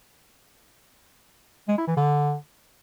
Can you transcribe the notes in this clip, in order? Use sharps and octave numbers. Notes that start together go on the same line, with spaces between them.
G#3
E4
E3
D3